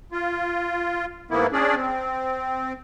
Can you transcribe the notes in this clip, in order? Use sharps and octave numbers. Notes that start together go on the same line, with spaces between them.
F4
G#2 E3 A#3 B3 E4
C#4 D4 G#4 D5
C4